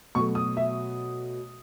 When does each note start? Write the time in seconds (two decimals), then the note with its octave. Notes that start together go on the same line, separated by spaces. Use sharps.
0.15 B2 F#3 A3 C#6
0.35 D#6
0.57 E5